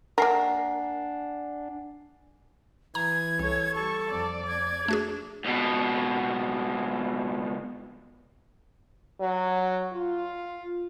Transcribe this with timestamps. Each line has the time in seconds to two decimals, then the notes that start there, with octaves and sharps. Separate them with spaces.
0.18 A#3 D4 A#4 F#5 G#5 C7
2.95 E3 A#5 G#6
3.39 C2 A4 C#5
3.75 G3 A4 C#6
4.10 F2 D5
4.48 G#6
4.88 A3 D4 F#4 G#4
5.45 C#2 B2
9.21 F#3
9.93 F4